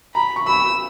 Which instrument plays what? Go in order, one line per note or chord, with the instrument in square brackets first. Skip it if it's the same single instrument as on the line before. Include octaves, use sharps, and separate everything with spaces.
[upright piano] A#5 [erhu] B5
[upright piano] C#6
[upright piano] B5 [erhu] E6